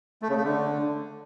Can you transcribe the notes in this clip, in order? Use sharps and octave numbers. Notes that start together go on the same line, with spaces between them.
A3
C#3
A3
D3